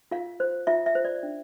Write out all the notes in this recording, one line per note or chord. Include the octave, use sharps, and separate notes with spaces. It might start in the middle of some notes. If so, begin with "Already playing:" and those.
F4 F5
C5
F4 E5
E5
C5
D5
D4